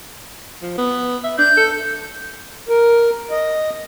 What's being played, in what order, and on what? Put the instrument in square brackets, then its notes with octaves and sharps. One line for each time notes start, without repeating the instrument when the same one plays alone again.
[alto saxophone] F3
B3
E5
[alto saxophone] D4 [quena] G6
[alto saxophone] A4
[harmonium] A#4
D#5